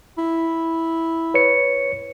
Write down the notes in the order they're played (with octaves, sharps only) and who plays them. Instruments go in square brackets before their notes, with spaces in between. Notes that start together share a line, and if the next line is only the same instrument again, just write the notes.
[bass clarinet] E4
[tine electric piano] B4 C#5 C#7